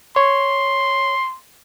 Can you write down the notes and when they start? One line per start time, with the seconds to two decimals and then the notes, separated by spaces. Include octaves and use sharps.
0.16 C#5 C6